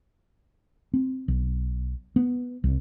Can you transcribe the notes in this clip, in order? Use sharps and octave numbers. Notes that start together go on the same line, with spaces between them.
C4
B1
B3
C2